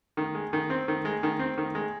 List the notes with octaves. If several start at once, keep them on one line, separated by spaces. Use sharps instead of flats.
D#3
G#3
D#3
C4
D#3
G#3
D#3
C4
D#3
G#3